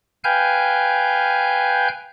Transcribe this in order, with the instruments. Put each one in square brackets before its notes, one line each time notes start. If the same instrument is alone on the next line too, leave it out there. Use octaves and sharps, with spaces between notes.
[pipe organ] B4 F5 G5 G#5 F6 G6